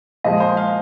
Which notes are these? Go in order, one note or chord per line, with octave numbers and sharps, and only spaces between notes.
A#2 F3 G#3 D#5
C5
F5